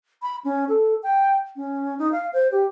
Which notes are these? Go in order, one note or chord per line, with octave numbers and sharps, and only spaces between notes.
B5
C#4
A4
G5
C#4
D#4
F5
C5
G4